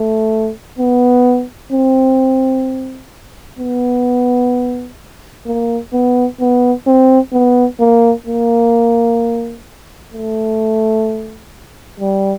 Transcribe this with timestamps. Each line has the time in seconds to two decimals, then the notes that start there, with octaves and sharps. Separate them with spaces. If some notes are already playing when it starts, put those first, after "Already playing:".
Already playing: A3
0.79 B3
1.72 C4
3.59 B3
5.46 A#3
5.93 B3
6.40 B3
6.87 C4
7.33 B3
7.80 A#3
8.27 A#3
10.14 A3
12.00 G3